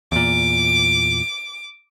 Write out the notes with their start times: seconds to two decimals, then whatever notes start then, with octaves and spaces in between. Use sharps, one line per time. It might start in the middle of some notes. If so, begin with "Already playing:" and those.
0.12 E2 A#2 D6